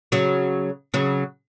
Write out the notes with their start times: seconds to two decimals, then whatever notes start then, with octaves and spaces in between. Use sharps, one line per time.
0.12 C#3 F#3
0.94 C#3 F#3